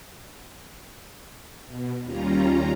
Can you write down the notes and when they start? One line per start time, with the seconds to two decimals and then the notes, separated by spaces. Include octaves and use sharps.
1.66 B2
2.03 D#2 G3 C#4 F4 A#5